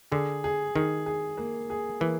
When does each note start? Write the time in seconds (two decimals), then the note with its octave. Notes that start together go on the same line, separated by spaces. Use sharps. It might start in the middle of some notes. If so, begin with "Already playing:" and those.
0.12 D3 G#4
0.44 G#4
0.75 D#3 G#4
1.06 G#4
1.38 A#3
1.70 G#4
2.00 E3 A#3